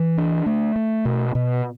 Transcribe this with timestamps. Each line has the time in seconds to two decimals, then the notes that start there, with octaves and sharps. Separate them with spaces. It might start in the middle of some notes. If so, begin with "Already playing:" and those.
Already playing: E3
0.18 D4
0.46 A3
0.76 A3
1.05 B2
1.35 B2